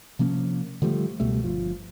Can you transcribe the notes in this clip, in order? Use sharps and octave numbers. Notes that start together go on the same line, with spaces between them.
C3 F3 A#3 C#4
D3 F3 G3 A3
C#2 B2 G3 A3
G1 F3